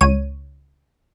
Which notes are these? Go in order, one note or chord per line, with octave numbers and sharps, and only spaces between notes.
C#2 C#5 D#7